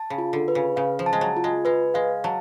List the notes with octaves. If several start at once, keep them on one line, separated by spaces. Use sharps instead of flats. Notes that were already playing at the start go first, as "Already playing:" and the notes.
Already playing: A5
C#3
F4
D3
B4
C#3
C#3 F5
F3
A5
G#3
F#3
F4
G#3
G#3 B4
G#3 F5
F#3 A5